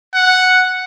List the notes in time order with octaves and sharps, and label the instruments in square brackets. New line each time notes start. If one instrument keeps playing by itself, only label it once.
[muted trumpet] F#5